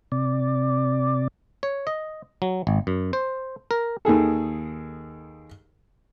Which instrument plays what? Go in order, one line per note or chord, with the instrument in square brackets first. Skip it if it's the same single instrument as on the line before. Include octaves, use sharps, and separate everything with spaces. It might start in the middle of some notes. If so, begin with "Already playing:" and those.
[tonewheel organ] C3 D5
[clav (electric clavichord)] C#5
D#5
F#3
G#1
F#2
C5
A#4
[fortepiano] D#2 D#3 G#4 A4